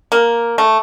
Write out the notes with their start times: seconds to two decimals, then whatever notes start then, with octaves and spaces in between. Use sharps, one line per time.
0.12 A#3
0.58 A3